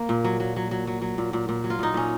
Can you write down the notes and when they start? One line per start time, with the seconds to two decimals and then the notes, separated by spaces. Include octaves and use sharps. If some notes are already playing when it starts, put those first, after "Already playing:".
Already playing: A#3
0.09 A#2
0.24 F#3
0.40 F#3
0.56 F#3
0.71 F#3
0.87 F#3
1.01 F#3
1.18 A#2
1.33 A#2
1.49 A#2
1.64 F#3
1.70 F4
1.79 A#2 D#4
1.94 A#2 C#4